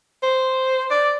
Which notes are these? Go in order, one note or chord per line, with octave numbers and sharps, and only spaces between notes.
C5
D5